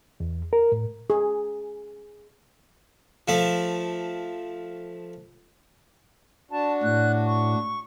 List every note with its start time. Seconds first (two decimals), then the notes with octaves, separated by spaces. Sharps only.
0.20 E2
0.53 A#4
0.72 A2
1.10 G#4
3.28 F3 A3
6.51 D4 F#4 A5
6.83 A2 F#6
7.26 C#6